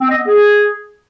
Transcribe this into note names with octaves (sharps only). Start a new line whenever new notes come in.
C4
D#5
B3
G#4